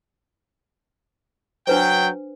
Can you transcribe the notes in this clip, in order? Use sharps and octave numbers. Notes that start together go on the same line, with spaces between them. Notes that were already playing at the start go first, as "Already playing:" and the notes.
F#3 D4 B4 C5 G5